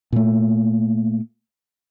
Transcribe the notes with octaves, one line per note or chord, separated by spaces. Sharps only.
A#2 A3